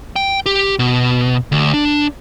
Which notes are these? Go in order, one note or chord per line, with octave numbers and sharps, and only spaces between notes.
G5
G4
B2
D2
D4